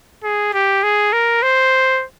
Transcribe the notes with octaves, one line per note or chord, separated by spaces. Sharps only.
G#4
G4
G#4
A#4
C5